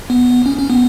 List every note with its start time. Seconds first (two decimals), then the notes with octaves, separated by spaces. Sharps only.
0.10 B3
0.46 C#4
0.58 C#4
0.70 B3